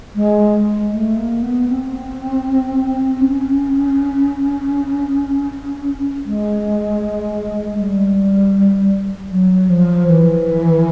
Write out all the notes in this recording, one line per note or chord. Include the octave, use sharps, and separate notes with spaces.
G#3
A3
A#3
B3
C4
C#4
G#3
G3
F#3
F3
E3